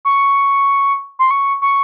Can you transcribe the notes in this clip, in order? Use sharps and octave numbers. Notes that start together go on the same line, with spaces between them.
C#6
C6
C#6
C#6